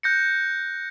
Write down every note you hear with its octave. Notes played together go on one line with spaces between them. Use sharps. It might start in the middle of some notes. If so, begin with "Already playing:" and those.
F#6 G6 A#6 C#7